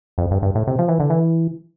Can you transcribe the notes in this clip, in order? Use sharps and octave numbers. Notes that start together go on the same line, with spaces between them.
F2
G2
G2
A2
C3
F3
E3
D3
E3